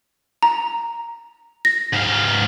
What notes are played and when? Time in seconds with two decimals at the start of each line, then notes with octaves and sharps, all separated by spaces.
0.43 A#5
1.65 A#6
1.94 G#2 F5